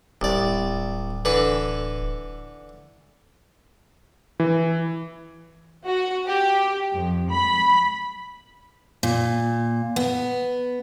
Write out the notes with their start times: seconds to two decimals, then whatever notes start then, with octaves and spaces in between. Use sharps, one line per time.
0.21 D1 C2 D5
1.25 D3 E3 B4
4.40 E3
5.86 F#4
6.27 G4
6.93 F2
7.31 B5
9.03 A#2
9.96 B3